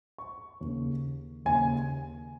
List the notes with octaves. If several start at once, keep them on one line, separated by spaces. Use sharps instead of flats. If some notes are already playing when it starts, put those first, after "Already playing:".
C#6
D#2 C#3
D#2 C#3 G#5